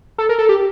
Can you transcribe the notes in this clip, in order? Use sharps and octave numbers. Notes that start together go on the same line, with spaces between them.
A4
A#4
A4
G4